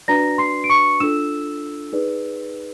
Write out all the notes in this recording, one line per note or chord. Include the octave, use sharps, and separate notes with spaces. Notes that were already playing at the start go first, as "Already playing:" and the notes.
D4 F#4 B4 D5 A#5 A#6
C6 C7
D7
C#6 C#7
D4 F4 A4 E6 E7
D#4 G#4 B4 D5